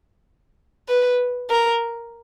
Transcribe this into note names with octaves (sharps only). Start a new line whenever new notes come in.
B4
A#4